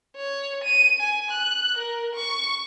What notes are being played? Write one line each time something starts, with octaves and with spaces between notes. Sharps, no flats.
C#5
D#7
G#5
F#6
A#4
C#6